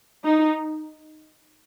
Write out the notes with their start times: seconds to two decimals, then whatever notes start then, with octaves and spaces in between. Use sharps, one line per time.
0.24 D#4